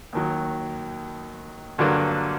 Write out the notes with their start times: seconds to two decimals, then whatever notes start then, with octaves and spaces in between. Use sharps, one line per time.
0.13 D#2 D#3 F#3
1.78 G2 D3 F#3 A#3 D4